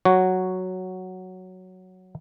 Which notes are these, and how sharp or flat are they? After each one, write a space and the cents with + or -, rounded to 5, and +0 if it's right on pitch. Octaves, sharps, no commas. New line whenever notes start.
F#3 +0 F#4 +0 C#5 +0